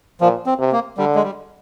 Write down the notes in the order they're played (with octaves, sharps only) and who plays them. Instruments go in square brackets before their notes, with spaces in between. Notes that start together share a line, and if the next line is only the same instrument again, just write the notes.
[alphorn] A#2 [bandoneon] F3
[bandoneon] C4
[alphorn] C3
[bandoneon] A#3
[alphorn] D3 [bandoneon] G3
[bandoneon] G#3
G3